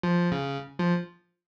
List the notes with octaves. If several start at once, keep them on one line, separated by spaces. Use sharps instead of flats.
F3
C#3
F3